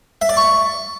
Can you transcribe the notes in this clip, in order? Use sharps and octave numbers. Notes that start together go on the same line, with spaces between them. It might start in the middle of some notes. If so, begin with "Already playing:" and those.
E5
D5
C#6